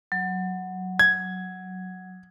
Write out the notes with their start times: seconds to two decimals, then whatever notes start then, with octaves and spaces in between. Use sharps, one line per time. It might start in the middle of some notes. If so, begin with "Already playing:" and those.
0.12 F#3
0.99 G#6